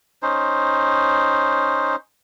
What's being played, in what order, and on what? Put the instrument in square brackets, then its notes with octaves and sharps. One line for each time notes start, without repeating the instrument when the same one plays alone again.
[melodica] C#4 D#4 C5